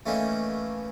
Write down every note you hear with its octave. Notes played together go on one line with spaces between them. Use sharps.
E3 A3 A#3 C#4 D#4